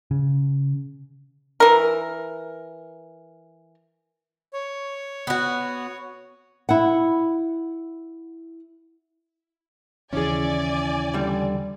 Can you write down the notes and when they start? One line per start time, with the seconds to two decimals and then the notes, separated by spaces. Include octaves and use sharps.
0.11 C#3
1.60 E3 A#4
4.53 C#5
5.27 B3 F#4
6.69 E4 F#5
10.13 D#2 C#3 E3 C#4 E4 G#4 D5 G#5
11.14 D3 G3